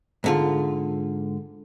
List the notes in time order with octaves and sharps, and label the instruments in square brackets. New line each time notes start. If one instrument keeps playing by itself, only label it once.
[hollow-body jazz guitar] G#2 D3 F4